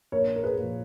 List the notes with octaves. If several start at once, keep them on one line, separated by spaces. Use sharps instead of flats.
A#1 A#4 C#5
A#4
G#4 B4
A#2 F3